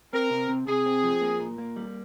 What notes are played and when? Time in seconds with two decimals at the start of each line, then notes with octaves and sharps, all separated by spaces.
0.13 C4 A#4
0.30 C3
0.49 C3
0.67 C3 G#4
0.86 C4
1.03 F3
1.21 A#3
1.40 A#2
1.58 A#3
1.76 G3